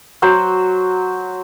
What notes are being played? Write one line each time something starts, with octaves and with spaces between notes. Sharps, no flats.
F#3 C5